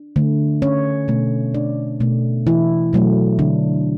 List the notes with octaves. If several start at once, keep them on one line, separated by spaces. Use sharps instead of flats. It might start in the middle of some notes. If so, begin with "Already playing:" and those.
Already playing: D4
D3 A3
C#4 C#5
B2 A3
D4 D5
B2 A3
E3 E4
B2 F#3 A3
D3 D4